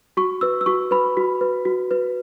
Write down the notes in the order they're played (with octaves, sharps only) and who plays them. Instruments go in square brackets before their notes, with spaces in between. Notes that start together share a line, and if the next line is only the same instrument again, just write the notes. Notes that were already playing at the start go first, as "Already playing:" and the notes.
[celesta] F#4 C#6
B4 E6
E6
F#4 C#6
B4 B5
F#4
B4
F#4
B4